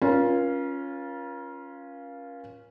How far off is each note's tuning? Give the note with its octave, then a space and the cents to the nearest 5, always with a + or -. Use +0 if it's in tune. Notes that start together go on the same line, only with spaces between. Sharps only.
C#4 +0 F4 +0 A#4 +40